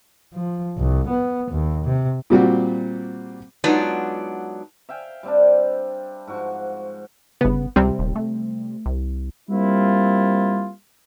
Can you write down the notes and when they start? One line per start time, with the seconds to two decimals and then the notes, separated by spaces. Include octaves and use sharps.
0.34 F3
0.78 C2
1.09 B3
1.52 D#2
1.86 C3
2.30 A#2 G3 C4 F#4
3.64 F#3 G#3 B3 D4 D#4 F4
4.89 E5 F5 G5 G#5
5.23 G3 C4 D4
6.27 G#2 F3 F#4 C#6
7.41 G1 C#3 B3
7.76 C#2 C3 G3 C4
7.99 D#1
8.16 A3
8.86 C2
9.50 G3 A#3 C4 E4 F4